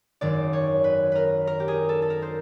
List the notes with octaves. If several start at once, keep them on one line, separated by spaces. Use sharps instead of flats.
G#1 F#2 D#3 D5
C#5
B4
A#4 B4
A#4
G4
G#4
A4
A4
A#4
C5